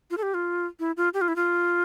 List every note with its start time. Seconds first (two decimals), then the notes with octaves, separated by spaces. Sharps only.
0.11 F4
0.17 A4
0.23 G4
0.34 F4
0.80 E4
0.97 F4
1.14 G4
1.21 F4
1.28 E4
1.36 F4